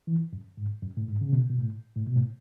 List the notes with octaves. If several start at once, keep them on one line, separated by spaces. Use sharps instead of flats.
E3
F#2
G#2
F#2
A2
G#2
C#3
B2
B2
A2
A2
B2
A2